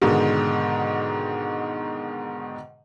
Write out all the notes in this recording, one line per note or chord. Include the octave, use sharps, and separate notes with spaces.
G#2 B2 D3 D#3 G#3